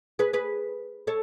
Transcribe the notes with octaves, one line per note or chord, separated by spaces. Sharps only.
G#4 B4
G#4 B4
A4 C#5